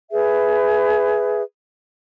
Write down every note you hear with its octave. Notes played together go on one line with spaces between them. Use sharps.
G#4 B4 E5